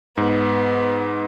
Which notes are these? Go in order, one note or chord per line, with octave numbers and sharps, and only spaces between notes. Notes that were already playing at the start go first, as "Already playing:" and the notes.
G#2 B3